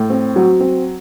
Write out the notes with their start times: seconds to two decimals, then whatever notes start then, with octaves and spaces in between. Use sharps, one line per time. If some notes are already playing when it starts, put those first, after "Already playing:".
Already playing: A2
0.10 C4
0.36 F#3
0.61 C4